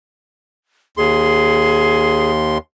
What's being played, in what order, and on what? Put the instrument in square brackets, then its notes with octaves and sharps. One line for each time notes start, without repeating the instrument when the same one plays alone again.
[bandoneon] D#2 C6 [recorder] G#4